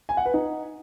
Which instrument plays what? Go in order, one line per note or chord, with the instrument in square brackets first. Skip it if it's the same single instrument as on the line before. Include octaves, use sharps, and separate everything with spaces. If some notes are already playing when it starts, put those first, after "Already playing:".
[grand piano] G#5
F#5
B4
D#4